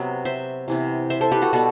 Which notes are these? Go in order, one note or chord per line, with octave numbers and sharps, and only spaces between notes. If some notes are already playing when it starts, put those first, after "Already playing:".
Already playing: C3 F#3 B3
C5 E5
C3 E3 B3
C5 E5
A4 C5
G4 B4
F#4 A4
B2 G3 B3 F#4 A4